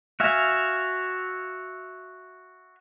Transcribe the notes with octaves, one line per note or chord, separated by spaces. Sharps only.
F#4 E5 F5 G#5